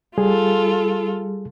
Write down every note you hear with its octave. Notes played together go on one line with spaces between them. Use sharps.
G3 F4 G#4 A4